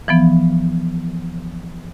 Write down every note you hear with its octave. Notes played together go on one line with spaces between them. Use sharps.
E3 F3 B3